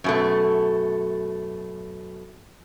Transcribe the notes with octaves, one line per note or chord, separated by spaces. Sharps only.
F#2 B2 A3